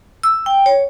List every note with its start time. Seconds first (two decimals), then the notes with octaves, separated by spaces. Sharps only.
0.23 E6
0.46 G5
0.66 C#5